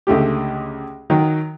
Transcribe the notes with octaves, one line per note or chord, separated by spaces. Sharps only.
C#2 D3 A3 G4
D#3 F#3